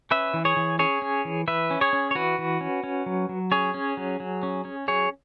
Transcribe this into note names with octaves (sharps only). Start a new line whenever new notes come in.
C#4 B4 E5
E3
G#4 C#5
E3
C#4 G#4 C#5
C#4
E3
E3 B4 E5
C#4
G#4 C#5
C#4
C#5
E3 F#4 B4
E3
C#4
C#4
F#3
F#3
C#4 G#4 C#5
C#4
F#3
F#3
C#4
C#4
F#3 G#4 C#5